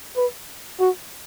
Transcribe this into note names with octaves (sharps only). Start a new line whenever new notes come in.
B4
F#4